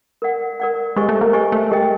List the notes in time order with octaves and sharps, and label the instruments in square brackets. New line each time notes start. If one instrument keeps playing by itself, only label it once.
[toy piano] A#4 D5 F#5
A#4 D5 F#5
[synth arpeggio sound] G#3 [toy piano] G4 C5 D#5 G#5 C#6
[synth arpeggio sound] A3
A#3
[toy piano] G4 C5 D#5 G#5 C#6
[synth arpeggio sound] A3
[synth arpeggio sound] G#3 [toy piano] G4 A#4 D#5 G5